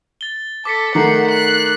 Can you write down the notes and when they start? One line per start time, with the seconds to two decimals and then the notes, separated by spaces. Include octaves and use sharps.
0.21 A6 G7
0.65 A4 D6 B6 C#7
0.95 D#3 A3 D#4 F#5 D6 C7
1.31 F#6